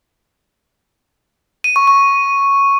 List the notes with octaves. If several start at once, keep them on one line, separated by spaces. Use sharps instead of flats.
D#7
C#6
C#6